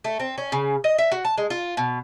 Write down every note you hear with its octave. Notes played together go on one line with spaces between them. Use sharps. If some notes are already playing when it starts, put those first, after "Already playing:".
A3
C4
C#4
C#3
D#5
E5
F#4
A5
G#3
F4
B2